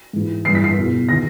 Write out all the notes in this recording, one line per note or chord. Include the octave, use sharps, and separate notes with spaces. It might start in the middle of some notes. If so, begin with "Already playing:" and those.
G#2 E3
G2 E3 C7
B6
C7
E2 B2
D#3 A#6